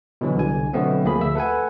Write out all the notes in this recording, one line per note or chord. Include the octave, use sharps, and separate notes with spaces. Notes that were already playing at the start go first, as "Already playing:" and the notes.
B2 D3 E3 F#3
C2 D3 G#5
B2 D3 F#3 A3 B3 C4
D2 F3 A#3 G#4 B5
D2 E5 E6
A4 B4 F#5 G#5